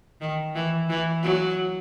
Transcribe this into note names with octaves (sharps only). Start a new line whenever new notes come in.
D#3
E3
E3
F#3